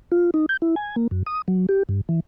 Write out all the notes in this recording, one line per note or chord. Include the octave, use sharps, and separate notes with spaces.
F4
D#4
G6
E4
G#5
A#3
F#2
D#6
F#3
G4
G2
E3